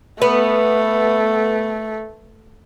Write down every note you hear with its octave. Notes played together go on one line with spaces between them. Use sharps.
A3 B3